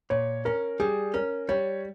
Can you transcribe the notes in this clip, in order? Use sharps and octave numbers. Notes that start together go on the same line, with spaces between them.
A#2 C#5
C#4 A#4
G3 G#4
C#4 A#4
G3 C#5